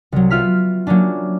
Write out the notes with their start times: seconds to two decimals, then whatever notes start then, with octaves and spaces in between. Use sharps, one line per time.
0.12 C2 F#3
0.30 B3 F4 E5 F6 B6
0.87 F#3 A#3 C#4 D4